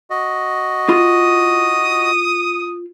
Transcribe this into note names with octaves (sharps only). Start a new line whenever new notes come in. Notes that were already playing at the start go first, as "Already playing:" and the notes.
F#4 D#5
E4 F4 C6 D#6